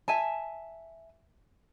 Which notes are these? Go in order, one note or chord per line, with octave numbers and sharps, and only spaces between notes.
E5 G#5 A5